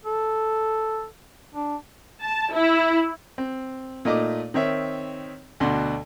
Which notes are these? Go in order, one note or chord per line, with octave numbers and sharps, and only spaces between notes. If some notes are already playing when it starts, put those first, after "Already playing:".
A4
D4
A5
E4
C4
A#2 A3 D#4 D#5 D6
D#3 C4 C#5 E5
D2 B2 D4 F#5 C6